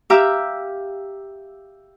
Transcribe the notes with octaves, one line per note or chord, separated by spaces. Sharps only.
G4 E5 F5 A#5 D6 E6